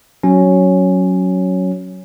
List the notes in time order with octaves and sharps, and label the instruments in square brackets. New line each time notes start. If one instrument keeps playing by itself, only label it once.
[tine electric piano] F#3 C#4